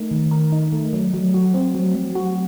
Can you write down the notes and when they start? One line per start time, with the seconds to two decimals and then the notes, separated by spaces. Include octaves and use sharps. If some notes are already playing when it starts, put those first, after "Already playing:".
Already playing: A3 D#4 A#4
0.11 D#3
0.31 A#4
0.52 D#4
0.72 A3
0.93 F#3
1.14 F#3
1.34 F#4
1.54 C4
1.75 F#3
1.95 F#3
2.15 F#4